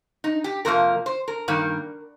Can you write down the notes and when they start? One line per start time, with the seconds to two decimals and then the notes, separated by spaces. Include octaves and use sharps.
0.24 D#4
0.44 G4
0.65 F2 C3 F3 A#3 A#4
1.06 C5
1.28 A#4
1.48 G2 D#3 A#3